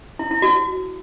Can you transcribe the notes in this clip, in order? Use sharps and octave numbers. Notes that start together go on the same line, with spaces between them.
E4
E4
F#4